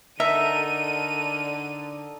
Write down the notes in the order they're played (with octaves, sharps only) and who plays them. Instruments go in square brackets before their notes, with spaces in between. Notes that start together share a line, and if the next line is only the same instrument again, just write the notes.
[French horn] D3 [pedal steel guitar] D#4 A4 A#4 [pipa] E5 [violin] D#7